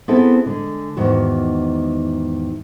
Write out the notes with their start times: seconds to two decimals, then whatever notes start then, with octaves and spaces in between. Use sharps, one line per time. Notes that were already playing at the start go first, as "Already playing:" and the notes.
0.08 B3 C4 E4 G#4 A4
0.46 D3 G#3
0.97 E2 G#2 D#3 F#4